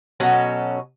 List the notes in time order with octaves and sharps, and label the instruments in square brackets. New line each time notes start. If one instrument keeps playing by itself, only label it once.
[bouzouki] B2 F#3 C#4 A4